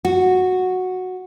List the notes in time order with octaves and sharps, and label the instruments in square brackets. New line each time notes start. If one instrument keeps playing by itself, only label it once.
[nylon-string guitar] F#4